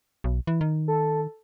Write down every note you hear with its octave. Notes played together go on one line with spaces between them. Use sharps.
B1
E3
D#3
A4